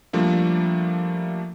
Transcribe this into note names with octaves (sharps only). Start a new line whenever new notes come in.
F3 G3 A3 A#3 D4